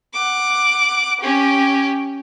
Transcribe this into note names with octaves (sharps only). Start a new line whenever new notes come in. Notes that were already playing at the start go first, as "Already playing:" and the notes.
F#5 D6
C#4 G4